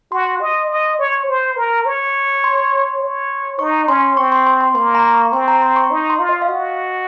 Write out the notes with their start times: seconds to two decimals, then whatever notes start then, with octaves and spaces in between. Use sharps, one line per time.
0.12 F#4 C6
0.41 D#5
0.70 D#5
0.99 C#5
1.28 C5
1.57 A#4
1.86 C#5
2.44 C6
3.02 C#5
3.59 D#4 C#6
3.88 C#4 C6
4.17 C4 C#6
4.32 C6
4.47 C6
4.61 C6
4.75 A#3 C6
4.95 A#5
5.14 C#6
5.33 C4 C6
5.48 A#5
5.62 C6
5.76 C#6
5.91 D#4
6.10 C6
6.20 F4
6.29 D#5
6.42 F5
6.49 F#4 D#5